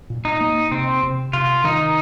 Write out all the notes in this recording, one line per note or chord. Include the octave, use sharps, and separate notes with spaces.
A#2
D#4
A#3
C3 C4
C3
C3 F4
D#3 D#4